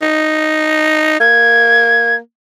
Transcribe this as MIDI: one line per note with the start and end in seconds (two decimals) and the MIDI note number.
0.02 1.20 63
1.20 2.18 58
1.20 2.15 92